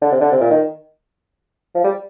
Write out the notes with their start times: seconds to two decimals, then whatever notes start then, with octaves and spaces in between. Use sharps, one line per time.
0.02 D3
0.12 C3
0.21 D3
0.32 C3
0.41 A#2
0.51 D#3
1.75 F3
1.84 G3